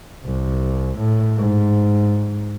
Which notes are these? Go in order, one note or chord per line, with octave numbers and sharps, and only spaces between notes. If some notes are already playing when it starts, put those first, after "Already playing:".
C2
A2
G#2